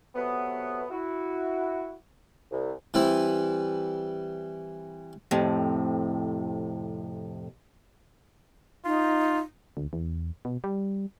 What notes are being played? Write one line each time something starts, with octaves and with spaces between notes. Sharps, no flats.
C3 F#3 A3 B3
E4 F#4
C2
E3 G3 C4 E4
F2 A2 C3
D#4 F4
D2
E2
B2
G3